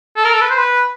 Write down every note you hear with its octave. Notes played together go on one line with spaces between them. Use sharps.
A4
A#4
A4
B4
C5
B4